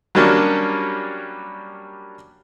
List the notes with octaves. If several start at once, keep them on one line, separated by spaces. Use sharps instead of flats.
F#3 G3 A#3 C#4 D4